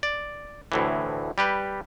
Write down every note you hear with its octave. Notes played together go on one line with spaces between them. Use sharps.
D5
D2 A2 E3
G3 G4 B4